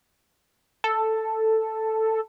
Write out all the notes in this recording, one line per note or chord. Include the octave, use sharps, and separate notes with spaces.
A4